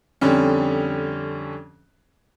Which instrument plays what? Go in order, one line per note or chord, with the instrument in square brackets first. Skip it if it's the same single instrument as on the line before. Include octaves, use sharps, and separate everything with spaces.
[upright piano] F2 D3 G3 C#4